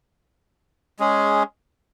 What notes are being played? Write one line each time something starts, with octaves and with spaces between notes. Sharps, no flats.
G#3 C#4 G#4